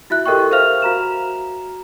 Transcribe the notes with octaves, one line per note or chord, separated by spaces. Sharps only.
E4 F#4 E5 F#6
G4 A4 A#4 D#5 G5 C#6
A#4 C5 E5 F5 F6 F7
F#4 A#5 E7